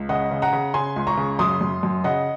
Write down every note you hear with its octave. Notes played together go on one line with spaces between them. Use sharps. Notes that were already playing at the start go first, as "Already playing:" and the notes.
Already playing: C#2
C#3 D#5 F#5
C#3
F#5 A#5
C#3
C#3 G#5 C6
C#2
A#5 C#6
C#3
F#2 C6 D#6
F#2
F#2
C#3 D#5 F#5